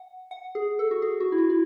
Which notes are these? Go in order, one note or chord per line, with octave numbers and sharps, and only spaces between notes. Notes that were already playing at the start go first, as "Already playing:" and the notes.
Already playing: F#5
F#5
G#4
A4
F#4
G#4
F#4
E4
F#4
E4